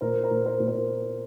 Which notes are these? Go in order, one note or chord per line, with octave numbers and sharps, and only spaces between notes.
A#2 A#4 C5
A#4 C5
A#2
A#4 C5
A#2
A#4 C5